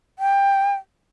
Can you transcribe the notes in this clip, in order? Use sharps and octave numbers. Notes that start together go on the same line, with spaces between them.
G5